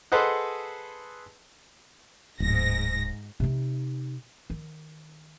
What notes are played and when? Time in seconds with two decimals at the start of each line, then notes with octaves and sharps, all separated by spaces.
0.12 G#4 A4 B4 C5 D#5 F#5
2.40 D1 G#2 A#6
3.40 C3 D#4
4.50 D#3